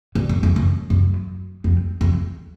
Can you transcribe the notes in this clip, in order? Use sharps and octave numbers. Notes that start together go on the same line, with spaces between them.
G2
F#2
F2
F#2
F#2
F2
F2